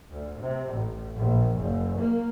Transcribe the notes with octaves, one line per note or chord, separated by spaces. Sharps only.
D2
C3
A1
A#1
F#1
A#3